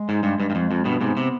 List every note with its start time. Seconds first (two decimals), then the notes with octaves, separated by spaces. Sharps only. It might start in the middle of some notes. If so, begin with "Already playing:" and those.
Already playing: G#3
0.09 G#2
0.23 G2
0.40 G2
0.50 G2
0.55 F2
0.71 F2
0.85 G2 B2 B3
1.01 G#2 C3
1.17 C3